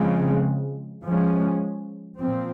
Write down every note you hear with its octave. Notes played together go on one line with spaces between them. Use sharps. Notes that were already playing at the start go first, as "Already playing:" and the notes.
Already playing: C#3 F3 G#3 C4
F3 G#3 C#4
A#2 F3 C4